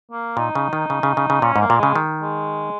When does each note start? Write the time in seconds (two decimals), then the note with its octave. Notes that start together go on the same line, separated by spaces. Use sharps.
0.12 A#3
0.37 A#2 D#4
0.55 C#3
0.73 D#3
0.90 C#3
1.03 C#3
1.17 C#3
1.30 C#3
1.42 A#2 C#4
1.56 G#2
1.61 A#3
1.70 A#2
1.78 C#3 G#3
1.96 D#3
2.23 G#3